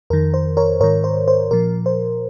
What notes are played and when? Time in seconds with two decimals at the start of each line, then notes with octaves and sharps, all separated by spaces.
0.10 F2 D#3 A#4
0.34 C5
0.57 A#4 C#5
0.80 G#2 D#3 A#4 C#5
1.04 C5
1.28 C5
1.51 A#2 F3 A#4
1.86 C5